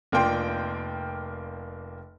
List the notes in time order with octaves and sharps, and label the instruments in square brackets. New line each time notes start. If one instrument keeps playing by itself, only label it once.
[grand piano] F1 A#3 D4 F4 G5 C6